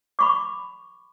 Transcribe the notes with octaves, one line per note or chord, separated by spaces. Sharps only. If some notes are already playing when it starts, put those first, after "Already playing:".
B5 C#6 D6